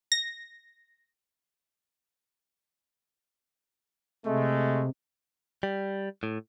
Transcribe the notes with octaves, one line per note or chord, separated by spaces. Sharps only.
A#6
C3 G#3 A3
G3
A2